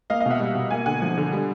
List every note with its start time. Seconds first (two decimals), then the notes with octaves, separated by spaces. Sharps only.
0.10 A#3 D#5 F5
0.20 D#5 F5
0.26 B2 E5 F#5
0.40 G3
0.55 B2
0.70 A#3 F#5 G#5
0.86 D3 F#5 G#5
1.02 F3
1.18 D3
1.32 G3